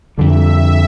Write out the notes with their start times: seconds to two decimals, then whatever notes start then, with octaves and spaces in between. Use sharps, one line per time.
0.18 F2 D3 G3 E5